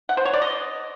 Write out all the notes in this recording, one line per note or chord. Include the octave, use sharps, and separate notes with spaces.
F#5
C5
C#5
D5
D#5